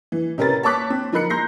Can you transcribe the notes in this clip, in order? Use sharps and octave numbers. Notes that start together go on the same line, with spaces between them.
E3
C3 C#4 A#4 B4 A6
C#5 A5 C#6 D6 F#6 B6
C4
F3 D#4 A#4 B5 F#6 C#7
A#5 C6 G6 A#6 C7